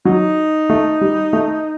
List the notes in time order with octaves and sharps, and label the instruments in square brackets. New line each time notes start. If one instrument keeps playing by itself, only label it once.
[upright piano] F#3 [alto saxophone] D#4
[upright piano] A3
G3
A3